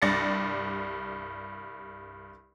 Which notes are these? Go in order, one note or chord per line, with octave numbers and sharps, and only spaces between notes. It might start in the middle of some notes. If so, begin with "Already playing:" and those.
C2 G2 D5 A6 A#6 C#7